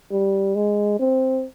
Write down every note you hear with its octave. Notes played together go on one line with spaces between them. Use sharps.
G3
G#3
C4